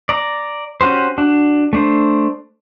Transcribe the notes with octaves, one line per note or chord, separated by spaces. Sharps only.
D5 A#5
C#4 F#4 G4 C5
D4 F#4
A3 D4 C5